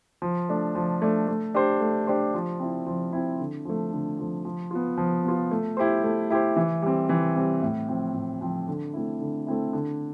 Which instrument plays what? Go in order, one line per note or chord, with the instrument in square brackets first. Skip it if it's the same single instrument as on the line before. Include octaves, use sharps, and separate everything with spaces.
[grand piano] F3
A3 D4
F3
A3 D4
A3
D4 G4 C5
A3
D4 G4 C5
F3
C4 E4
F3
C4 E4
D3
F3 A3
D3
F3 A3
F3
B3 F4
F3
B3 F4
A3
E4 G4 C5
A3
E4 G4 C5
E3
G3 C4
E3
G3 C4
A2
F3 C4
A2
F3 C4
D3
A3 C4 E4
D3
A3 C4 E4
D3